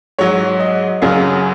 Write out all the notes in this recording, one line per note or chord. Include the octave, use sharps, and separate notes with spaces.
G#2 F#3 C#5
D#5
F#2 C#3 F#3 F5